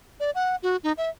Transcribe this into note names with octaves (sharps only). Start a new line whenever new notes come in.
D5
F#5
F#4
D#4
E5